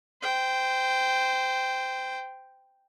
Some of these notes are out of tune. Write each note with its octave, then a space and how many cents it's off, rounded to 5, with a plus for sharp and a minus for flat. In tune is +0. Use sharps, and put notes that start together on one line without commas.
C5 -20 G5 +0